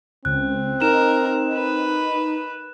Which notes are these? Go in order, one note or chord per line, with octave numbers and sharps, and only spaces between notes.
C#2 C4 F#6
D#4 A#4 E7
B4